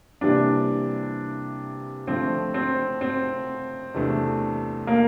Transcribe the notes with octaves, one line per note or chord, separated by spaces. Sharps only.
C3 E3 G3 A#3 D4
D3 F3 A3 C4
C4
C4
E2 C3 E3 A3 D4
A#3